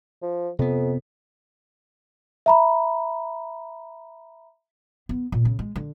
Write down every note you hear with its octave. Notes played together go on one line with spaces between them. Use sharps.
F3
F2 C3 B3
E5 A#5 B5
B3
A#2
C#3
G#3
D3